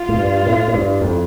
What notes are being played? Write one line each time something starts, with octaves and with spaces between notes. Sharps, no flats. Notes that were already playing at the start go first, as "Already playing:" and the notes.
Already playing: F4
A2
G2
A2
A2
G2
F2